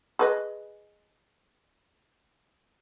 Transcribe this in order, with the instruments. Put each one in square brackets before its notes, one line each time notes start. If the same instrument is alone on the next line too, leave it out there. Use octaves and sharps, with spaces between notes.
[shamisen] G#4 B4 D#5